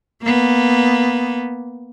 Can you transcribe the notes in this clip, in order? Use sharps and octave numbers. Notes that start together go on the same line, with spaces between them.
A#3 B3